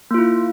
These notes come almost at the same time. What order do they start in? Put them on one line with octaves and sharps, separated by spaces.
A#3 F4 E4